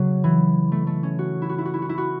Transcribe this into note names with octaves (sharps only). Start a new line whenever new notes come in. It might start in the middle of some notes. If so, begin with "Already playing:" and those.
Already playing: C#3 F#3
E3
A3
A3
C#4
F#4
E4
F#4
E4
F#4
E4
F#4
E4
F#4